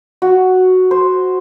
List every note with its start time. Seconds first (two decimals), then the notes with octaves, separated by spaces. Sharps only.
0.22 F#4
0.91 C5